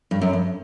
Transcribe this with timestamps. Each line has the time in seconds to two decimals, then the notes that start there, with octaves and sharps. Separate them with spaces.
0.11 G2
0.21 F#2
0.33 G2